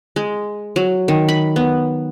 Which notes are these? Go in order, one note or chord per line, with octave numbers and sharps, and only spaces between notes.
G#3
F#3
D#3
B5
B3